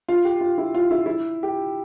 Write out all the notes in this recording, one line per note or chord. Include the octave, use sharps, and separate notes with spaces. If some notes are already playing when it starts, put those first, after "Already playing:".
F4
G4
F4
E4
F4
E4
E4
G4